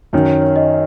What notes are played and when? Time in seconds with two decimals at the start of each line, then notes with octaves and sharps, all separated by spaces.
0.13 F#2 D#3 F#3 C#5
0.27 C#5
0.41 C#5
0.56 D#5